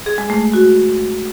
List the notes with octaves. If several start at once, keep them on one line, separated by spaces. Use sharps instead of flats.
G#4
G#3
A3
A3
F#4